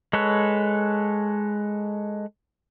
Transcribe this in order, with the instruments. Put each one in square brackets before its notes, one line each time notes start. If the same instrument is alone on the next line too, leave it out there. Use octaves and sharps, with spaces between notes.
[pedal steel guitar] G#3 A4 B4 C#5